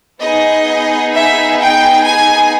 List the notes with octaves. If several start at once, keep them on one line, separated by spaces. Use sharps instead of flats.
B3 D#4 G#4 D#5
E5
G5
G#5